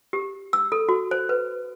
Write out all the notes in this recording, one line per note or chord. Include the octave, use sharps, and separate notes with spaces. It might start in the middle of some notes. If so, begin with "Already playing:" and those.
G4
E6
A4
F#4
C5
B4